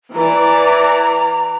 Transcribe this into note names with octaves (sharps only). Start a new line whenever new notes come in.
E3 D5 A#5